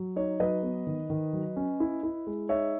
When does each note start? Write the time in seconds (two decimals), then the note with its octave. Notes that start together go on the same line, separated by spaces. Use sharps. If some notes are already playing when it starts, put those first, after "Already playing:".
Already playing: F#3
0.16 D#4 C#5
0.40 F#3 B4 D#5
0.63 B3
0.87 D#3
1.10 D#3
1.33 F#3
1.56 C#4
1.80 E4
2.03 E4
2.27 G#3
2.49 D#4 C#5 E5